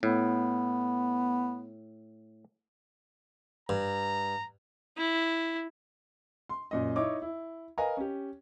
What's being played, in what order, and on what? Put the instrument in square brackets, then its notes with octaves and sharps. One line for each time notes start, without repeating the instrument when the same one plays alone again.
[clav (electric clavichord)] A2 [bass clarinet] B3
[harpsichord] G2 [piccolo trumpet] A#5
[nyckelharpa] E4
[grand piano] C6
F#2 A#2 D#5
D#4 E4 C#5 D#5 D6
E4
A#4 B4 D#5 F5 G#5 A#5
C#4 G4